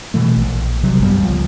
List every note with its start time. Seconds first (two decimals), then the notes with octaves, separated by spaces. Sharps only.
0.14 B2 E3 A3
0.37 A#1
0.83 C3 F#3 G3
1.00 A#1 G2 G3 B3
1.18 C#2 F3